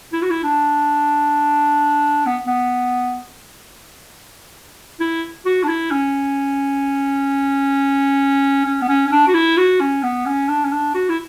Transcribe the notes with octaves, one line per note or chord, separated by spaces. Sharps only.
E4
F#4
E4
D4
B3
B3
E4
F#4
D4
E4
C#4
C#4
B3
C#4
C#4
D4
F#4
E4
F#4
C#4
B3
C#4
D4
C#4
D4
F#4
E4